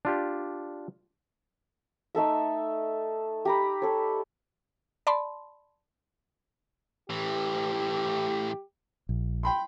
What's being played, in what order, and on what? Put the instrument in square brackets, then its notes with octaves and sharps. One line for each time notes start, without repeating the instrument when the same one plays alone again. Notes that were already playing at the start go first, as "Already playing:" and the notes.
[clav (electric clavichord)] D4 F4 G4
[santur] A3 D#4 A4 E5
G4 A#5 B5
A4 C#5
[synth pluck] D5 A5 B5 C6
[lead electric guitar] A2 E3 [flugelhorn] G4
[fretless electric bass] A#1
[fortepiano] G5 B5 C6